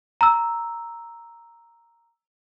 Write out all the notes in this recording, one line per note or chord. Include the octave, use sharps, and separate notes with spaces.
A#5 E6